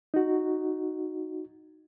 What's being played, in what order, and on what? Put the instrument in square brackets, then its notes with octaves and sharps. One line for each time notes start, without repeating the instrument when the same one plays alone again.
[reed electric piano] D#4 F#4